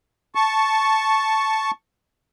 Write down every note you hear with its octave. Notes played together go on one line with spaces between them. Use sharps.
A5 C#6